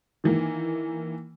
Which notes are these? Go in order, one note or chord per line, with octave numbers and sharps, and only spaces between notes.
D#3 E3 A#3